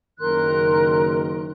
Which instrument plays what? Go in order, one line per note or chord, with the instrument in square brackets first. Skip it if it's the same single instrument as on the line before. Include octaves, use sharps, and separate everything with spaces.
[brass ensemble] F#1 D#3 [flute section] A#4 C6 F#6